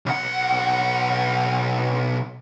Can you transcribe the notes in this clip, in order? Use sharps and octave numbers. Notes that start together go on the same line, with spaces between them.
B1 F#5